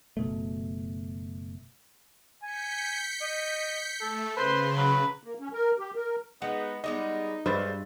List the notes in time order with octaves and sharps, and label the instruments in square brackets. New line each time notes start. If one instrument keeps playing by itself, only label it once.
[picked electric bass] F#1 B2 A3
[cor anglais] G#5 [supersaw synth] G6 B6 C#7
[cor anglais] D#5
[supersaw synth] A3 [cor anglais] A4
[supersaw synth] C#3 [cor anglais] B4 [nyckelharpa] C5 C6
[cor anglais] F#3 [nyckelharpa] B4
[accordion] A#3
C#4
A#4
G4
A#4
[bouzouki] G#3 [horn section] B3 D#4 [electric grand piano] F#5
[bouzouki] G3 G#3 B3 [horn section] D#4 [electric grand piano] D#5
[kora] G2 E5 [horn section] A#2 [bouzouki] G#3 [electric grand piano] B4 C5 A6